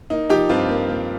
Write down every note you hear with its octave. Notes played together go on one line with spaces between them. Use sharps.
A#3 D#4
F3 D#4 G4
G2 C4 F4
A#3
A#3